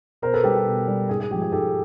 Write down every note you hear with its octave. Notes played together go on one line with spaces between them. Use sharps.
B2 A#4 C5
A4 B4
G3 G4 A4
G4
B2
G3
G#2 G#4
G#4
F3 G#3 G4
G#4
G#2 G4 A4